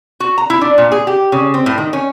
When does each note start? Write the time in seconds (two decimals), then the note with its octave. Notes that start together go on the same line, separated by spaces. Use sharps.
0.20 F#4
0.38 A#5
0.50 E4
0.61 D4
0.78 A#2
0.92 G#4
1.07 G4
1.32 C#3
1.54 C4
1.66 A2
1.78 D#3
1.93 C#4